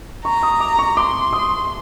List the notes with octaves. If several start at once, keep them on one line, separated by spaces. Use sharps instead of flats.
A#5 C#6
D#6
D6
C#6
C6 D6
D#6